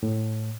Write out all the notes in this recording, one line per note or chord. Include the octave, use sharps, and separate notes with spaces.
A2